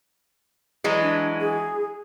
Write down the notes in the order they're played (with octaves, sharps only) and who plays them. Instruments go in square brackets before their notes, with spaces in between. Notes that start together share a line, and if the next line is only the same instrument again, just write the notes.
[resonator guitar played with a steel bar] E3 F#3 G#3
[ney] D4
G#4